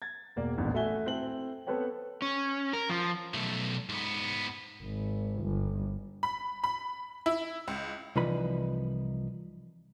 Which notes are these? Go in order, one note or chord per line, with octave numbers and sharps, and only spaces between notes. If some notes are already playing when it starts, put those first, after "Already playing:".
G#6 A6
E1 A#3 D5
D#1 A1 E2 G2 A#2
A3 F#4 E5 G#5 G7
C4 E4 A4 F#7
B3 C4 A4 B4 C#5 G5
C#4
A#4
F3
B1 A3
G#2 B3
G#1
G1
B5
B5
E4
C#2
C2 E3 F3 D#4 B4 B5